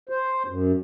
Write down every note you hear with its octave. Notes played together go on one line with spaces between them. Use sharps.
C5
F#2